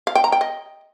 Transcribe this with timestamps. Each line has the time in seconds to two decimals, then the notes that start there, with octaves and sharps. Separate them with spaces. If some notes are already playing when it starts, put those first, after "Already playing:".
0.07 F5
0.15 G5
0.24 A#5
0.32 G5
0.41 D#5